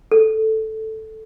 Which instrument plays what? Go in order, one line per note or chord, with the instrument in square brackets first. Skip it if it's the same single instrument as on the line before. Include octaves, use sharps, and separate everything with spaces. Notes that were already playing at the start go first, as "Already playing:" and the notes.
[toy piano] A4